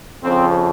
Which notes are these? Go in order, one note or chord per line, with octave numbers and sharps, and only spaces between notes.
F2 C#3 F3 C4